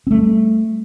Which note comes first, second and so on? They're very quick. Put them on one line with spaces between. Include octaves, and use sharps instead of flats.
C4 A3 G3